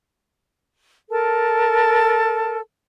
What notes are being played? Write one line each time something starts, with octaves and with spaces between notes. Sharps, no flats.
A4 A#4 A5